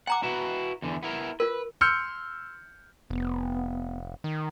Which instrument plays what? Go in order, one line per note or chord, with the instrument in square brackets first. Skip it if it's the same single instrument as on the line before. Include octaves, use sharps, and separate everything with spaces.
[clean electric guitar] F#5 [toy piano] G#5 A#5 D6
[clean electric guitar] E4 F#4 B4
E2 D3 E3
B3 E4 A#4
[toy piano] F4 A#4 [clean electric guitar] B4
[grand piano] C6 E6 F6 G6 C#7
[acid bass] F1 [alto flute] B3
[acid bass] D#3